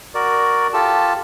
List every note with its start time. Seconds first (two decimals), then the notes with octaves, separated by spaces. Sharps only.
0.14 F#4 A#4 D5
0.73 F4 G4 A4 A5